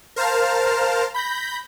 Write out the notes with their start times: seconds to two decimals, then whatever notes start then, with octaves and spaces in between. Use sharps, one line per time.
0.16 A#4 C5 F5 A5 F6
1.14 B5 G6 A#6